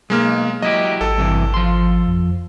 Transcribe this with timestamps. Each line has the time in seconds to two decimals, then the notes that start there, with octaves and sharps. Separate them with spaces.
0.10 B1 G#3 A#3 F6
0.62 F#3 E4 G4 D#5
1.01 G#1 A4
1.18 G2 C3 E3
1.54 F3 C6
2.07 F2